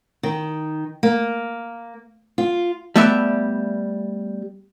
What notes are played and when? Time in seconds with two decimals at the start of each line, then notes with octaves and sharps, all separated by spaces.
0.23 D#3
1.03 A#3
2.38 F4
2.96 G3 A3 B3 D5 E5